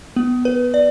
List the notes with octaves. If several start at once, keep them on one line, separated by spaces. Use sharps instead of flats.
B3
B4
D5